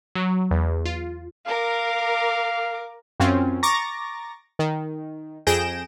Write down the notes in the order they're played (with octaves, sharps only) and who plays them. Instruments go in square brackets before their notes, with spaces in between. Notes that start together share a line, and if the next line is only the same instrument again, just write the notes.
[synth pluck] F#3
E2
F4
[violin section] A#4 D6 [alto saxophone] F5
[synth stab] F#2 C4 C#4 F4
A#5 C#6 D6 A6 A#6
D#3
F2 G#4 G6 A#6 D7 E7